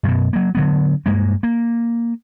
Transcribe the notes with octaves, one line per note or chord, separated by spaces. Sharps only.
F#2 B2
F#3 A#3
D3 F#3 B3
G2 G#3 A#3
A#3